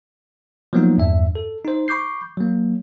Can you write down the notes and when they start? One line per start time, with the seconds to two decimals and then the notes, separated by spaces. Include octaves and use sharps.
0.73 F3 F#3 A#3 B3 D#4
0.98 E2 G2 E5
1.35 A4
1.65 D#4 C5
1.88 B5 C#6 D6 G6 C7
2.38 F#3 A#3